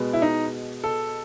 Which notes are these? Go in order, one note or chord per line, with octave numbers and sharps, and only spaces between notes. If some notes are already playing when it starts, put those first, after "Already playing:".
Already playing: B2 G#3 B3
E4
D#4
A4